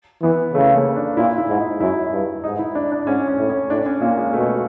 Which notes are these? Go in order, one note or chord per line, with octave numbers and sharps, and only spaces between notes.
E3 B3
C#3 A3
A#3
D4
A#2 E4
E4
G#2
D#4
F#2 E4
G2
G#2 D#4
E4
D4
D4
G#2 C#4
C#4
A2
C#4
A2 D4
C#4
A#2 A#3
G#3
B2 A3